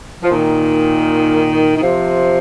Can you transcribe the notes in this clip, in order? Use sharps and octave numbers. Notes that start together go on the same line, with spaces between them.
F3
A#2 D#3
D#3
C3 F3